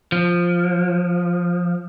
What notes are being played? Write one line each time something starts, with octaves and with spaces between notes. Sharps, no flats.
F3